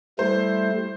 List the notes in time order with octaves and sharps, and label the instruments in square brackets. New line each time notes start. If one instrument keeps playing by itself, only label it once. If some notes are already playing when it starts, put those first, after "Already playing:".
[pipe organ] G3 A3 E4 [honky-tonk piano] C5